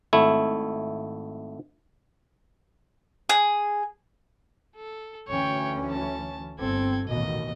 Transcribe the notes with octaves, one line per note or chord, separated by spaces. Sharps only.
G#1 A3 E4
G#4
A4
D2 E3 C#4 C#5 G5
A5
G1 C4 A4 G#6
A1 D#2 B2 D#5